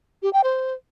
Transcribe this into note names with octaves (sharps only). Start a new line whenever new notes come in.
G4
G5
C5